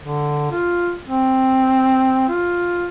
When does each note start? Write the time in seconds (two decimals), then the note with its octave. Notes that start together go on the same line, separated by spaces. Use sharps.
0.01 D3
0.52 F4
1.05 C4
2.28 F4